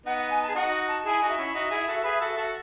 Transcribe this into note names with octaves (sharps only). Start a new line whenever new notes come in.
B3 D#4 F#5
F#5
G#5
A5
G#4
D#4 F#4 F#5
A5
E4 G#4 G#5 A5
D#4 F#4
E5
C#4 E4
D#4 F#4
E4 G#4
F#4 A4
G#4 B4
F#4 A4
F#4 A4